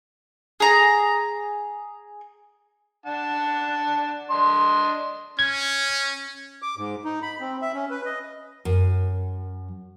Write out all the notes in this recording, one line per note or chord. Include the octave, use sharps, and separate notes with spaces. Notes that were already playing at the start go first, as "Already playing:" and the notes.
G#4 A#5
D4 F#5 A5
D4 D#5 C6
C#4 G#6
D6
G#2
D#4
B5
C4
E5
C#4
B4
D#5
F#2